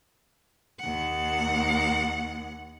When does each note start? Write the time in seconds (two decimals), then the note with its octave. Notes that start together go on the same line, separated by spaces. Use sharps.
0.80 D#2 F#5